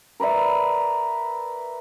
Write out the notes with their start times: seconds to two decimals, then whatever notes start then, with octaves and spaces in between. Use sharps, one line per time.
0.20 A#4 B4 D5 E5